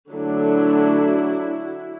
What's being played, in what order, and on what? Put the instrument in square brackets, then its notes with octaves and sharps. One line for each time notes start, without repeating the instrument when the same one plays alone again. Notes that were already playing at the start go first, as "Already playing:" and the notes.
[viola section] D3 F#3 A3 D4 E4 F#4